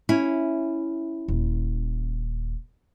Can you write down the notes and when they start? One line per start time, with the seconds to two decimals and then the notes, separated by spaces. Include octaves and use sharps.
0.09 C#4 E4
1.28 D#1